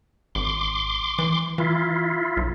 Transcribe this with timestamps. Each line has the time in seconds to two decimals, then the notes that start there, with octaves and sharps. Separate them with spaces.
0.35 G#1 C6 D6
1.19 E3
1.58 E3 E4 F4
2.37 B1